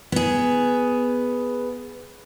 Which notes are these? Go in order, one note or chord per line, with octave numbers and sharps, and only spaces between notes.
B3 G#4